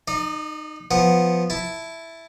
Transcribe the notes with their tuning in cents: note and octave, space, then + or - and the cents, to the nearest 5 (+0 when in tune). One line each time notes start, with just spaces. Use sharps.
D#4 -15 D5 +40
F3 +0 B3 +0 F#5 +0
E4 +0 A5 +0